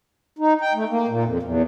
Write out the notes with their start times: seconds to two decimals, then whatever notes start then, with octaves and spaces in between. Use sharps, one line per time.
0.39 D#4
0.61 G5
0.74 A3
0.89 A#3
1.08 A#2
1.24 F2
1.43 E2